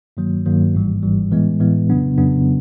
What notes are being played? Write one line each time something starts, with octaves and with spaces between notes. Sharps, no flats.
G2 D#3 F#3 A#3
G2 D#3 F#3 A#3
G#1 G#2 E3 G3
G#1 G#2 E3 G3
A2 E3 G#3 B3
A2 E3 G#3 B3
F2 C#3 F#3 B3 D4
F2 C#3 F#3 B3 D4